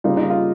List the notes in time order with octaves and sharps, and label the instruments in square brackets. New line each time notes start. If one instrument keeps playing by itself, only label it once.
[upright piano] C#3 G3 A#3 F4 [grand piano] D#4
[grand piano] D#4
F4